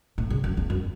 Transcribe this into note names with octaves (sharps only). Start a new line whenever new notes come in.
A2
C#3
F#2
E2
F#2